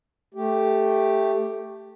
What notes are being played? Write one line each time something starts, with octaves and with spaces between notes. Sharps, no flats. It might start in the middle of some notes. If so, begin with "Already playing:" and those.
A3 G4